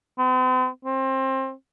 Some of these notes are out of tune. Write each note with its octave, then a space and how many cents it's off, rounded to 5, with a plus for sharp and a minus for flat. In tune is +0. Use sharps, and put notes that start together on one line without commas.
C4 -45
C4 +25